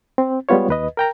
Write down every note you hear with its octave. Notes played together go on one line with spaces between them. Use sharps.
C4
G3 G#3 B3 F4 C#5
D#2 B4 D#5
A#4 G5 A#5